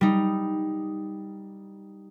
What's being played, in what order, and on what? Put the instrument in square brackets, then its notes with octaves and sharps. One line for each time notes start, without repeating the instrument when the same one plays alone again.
[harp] G3 D#4